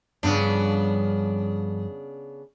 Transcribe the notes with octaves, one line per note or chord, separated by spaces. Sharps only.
G2 C#3 F3 B3 D4